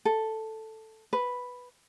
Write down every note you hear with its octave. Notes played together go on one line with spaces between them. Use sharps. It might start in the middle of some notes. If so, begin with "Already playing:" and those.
A4
B4